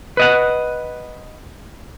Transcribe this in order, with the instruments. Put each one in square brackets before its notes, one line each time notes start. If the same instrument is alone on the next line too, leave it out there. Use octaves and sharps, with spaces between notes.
[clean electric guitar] B4 D#5 F#5